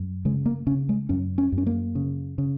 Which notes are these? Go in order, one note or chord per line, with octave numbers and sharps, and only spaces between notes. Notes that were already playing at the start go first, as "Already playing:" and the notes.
Already playing: F#2
C#3 G#3
A#3
C#3 C#4
G#3
F#2 C#4
C#4
F#2
C#4
A#3
C#3
C#3